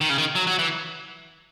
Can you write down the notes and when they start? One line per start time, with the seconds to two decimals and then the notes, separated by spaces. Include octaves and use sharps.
0.01 D#3
0.09 C#3
0.18 D#3
0.35 F#3
0.47 F#3
0.59 E3